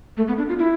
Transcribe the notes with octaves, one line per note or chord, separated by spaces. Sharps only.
A3
B3
D4
F4
E4